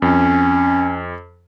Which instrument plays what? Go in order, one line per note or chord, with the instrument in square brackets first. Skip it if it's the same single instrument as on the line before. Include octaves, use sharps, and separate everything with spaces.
[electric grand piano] F2 [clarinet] C#4